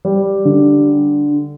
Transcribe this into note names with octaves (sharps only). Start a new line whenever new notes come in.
G3
D3